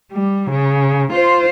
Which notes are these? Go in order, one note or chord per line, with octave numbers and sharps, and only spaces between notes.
G3
C#3
F4 C5